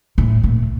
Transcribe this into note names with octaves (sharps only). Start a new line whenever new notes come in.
A2
A#2